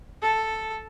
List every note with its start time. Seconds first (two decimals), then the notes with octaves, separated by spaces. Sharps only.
0.22 A4